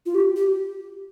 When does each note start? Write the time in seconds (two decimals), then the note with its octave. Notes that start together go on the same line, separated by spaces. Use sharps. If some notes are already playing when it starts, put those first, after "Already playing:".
0.06 F4
0.15 G4
0.36 G4